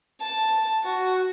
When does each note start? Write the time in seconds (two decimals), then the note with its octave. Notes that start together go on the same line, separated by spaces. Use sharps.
0.20 A5
0.84 F#4